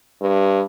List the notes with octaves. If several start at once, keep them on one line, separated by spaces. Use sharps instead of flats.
G2